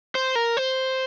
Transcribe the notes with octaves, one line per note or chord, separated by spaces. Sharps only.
C5
A#4
C5